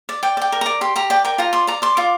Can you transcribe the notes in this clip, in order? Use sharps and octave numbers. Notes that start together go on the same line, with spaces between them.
D5
D5 G5
D5 G5
A#4
D5 A#5
G4 C6
G4 A#5
D5 G5
A#4 G5
F4 A#5
D5 C6
D5 A#5
D5 C6
F4 D6